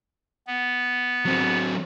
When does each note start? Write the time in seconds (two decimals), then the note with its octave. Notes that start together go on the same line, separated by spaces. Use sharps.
0.47 B3
1.25 F#3 C4